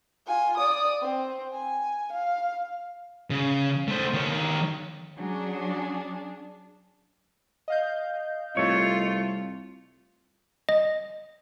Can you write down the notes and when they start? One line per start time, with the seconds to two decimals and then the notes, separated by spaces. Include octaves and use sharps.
0.27 F4 G#5
0.57 D5 D#6
1.01 C4
1.52 G#5
2.12 F5
3.30 C#3
3.88 A3 C5
4.14 D#3 C#5
5.17 F#3 C#4 D4 G#4
7.68 D#5 F5 G6
8.57 C2 A3 F4 C#5
10.69 D#5